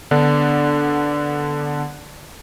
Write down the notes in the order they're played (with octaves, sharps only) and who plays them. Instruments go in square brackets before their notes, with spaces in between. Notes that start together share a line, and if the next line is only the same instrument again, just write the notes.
[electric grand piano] D3 B3 D4